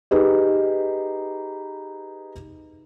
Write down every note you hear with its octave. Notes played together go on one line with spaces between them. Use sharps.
D#4 G4 G#4 B4 D#5